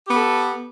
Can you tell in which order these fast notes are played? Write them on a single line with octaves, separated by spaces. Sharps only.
G4 B3 A4